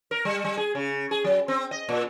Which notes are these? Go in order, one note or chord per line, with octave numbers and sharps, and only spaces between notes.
A#4
G3
G3
G#4
C#3
G#4
F#3
C4
D#5
A#2